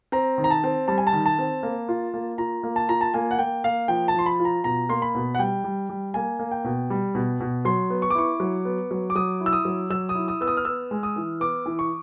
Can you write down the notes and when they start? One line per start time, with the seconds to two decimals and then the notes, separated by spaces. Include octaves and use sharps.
0.12 C4 A#5
0.38 D#3
0.44 A#5
0.50 A5
0.64 C4
0.88 G3 A5
0.98 G#5
1.07 A5
1.13 D#3
1.26 A5
1.39 C4
1.63 A#3
1.89 F4
2.14 A#3
2.38 F4 A#5
2.63 A#3
2.76 A5
2.89 F4 A#5
3.01 A5
3.14 A#3 G#5
3.31 F#5
3.39 A#3 G5
3.64 A#3 F5
3.88 F3 G5
4.08 A5
4.14 F3 C6
4.26 B5
4.40 F4
4.45 A#5
4.64 B2 A#5
4.89 A#3 C6
5.02 B5
5.15 B2
5.35 F#5
5.39 G3 G5
5.64 G3
5.90 G3
6.14 A#3 G#5
6.39 A#3
6.51 G5
6.64 B2
6.90 G3
7.15 B2
7.40 B2
7.65 F#3 C6
7.90 B3
8.02 C#6
8.10 D6
8.15 E4 C#6
8.40 F#3
8.65 B3
8.91 F#3
9.10 D6
9.15 F#3 D#6
9.41 E4
9.46 E6
9.53 D#6
9.65 F#3
9.90 F#3 E6
10.09 D#6
10.15 E4
10.28 D#6
10.41 B3 E6
10.47 D#6
10.57 F6
10.65 B3 E6
10.91 G#3
11.03 D#6
11.16 E3
11.40 B3 D6
11.66 E3
11.79 C#6